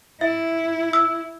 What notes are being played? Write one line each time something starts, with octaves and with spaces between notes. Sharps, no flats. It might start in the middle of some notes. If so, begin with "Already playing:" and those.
E4 E5
E6